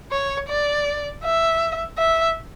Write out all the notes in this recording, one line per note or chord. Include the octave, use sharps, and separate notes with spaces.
C#5
D5
E5
E5